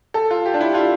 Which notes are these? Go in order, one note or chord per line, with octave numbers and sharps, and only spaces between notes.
A4
F4
G4
D4
E4
F4